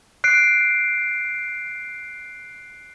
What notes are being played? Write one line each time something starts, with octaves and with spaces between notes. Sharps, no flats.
F#6 C7 D7